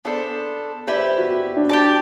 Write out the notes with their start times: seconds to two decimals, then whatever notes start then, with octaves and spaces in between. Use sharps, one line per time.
0.05 B3 D4 A4 C5 D5
0.87 E4 G4 B4 D5
0.97 C5
1.18 F#4
1.56 D4
1.69 G4 D5 A5